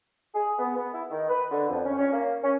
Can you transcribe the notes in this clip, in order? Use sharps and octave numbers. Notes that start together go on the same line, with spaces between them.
G#4
B3
B3
E4
D#3
B4
D3
F2
C#4
C#4
A#3
C#4